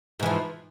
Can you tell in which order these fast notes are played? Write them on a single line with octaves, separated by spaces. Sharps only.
G#2 E3 F3